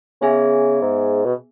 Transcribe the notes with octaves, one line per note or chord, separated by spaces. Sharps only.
C#3 B3 G#4 E5 G#5
G#2
B2